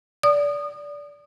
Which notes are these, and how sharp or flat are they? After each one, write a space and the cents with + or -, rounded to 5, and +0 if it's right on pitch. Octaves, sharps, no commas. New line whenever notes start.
D5 -15 D#6 -25